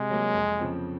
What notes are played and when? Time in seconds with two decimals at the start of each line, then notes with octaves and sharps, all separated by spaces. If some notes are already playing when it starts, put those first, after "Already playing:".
Already playing: C3 G#3
0.10 F#3 A#3
0.34 F2
0.59 C#3 F3 C4